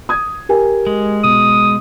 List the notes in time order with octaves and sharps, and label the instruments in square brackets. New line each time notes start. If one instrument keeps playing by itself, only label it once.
[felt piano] D#6 G#6
G4 A#4 G#5
[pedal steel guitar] G#3
[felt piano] B2 [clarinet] D#6